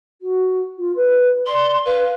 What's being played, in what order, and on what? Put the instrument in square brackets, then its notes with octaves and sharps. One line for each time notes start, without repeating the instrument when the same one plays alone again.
[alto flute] F#4
F4
B4
[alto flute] D5 [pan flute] C6
[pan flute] B4 [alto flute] F5